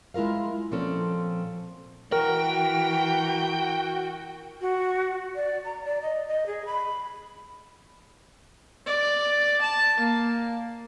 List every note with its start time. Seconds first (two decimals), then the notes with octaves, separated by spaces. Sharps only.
0.14 G#3 E4 F4 A#4 F5
0.71 A#2 F3 C4 C#4 A4
2.12 E3 F#4 A#4 G5
4.61 F#4
5.35 D5
5.65 A#5
5.84 D5
6.02 D#5
6.28 D#5
6.46 G#4
6.65 B5
8.86 D5
9.61 A5
9.99 A#3